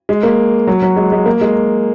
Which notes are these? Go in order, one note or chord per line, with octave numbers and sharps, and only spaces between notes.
G#3
A#3
F#3
F#3
G#3
G#3
A#3
G#3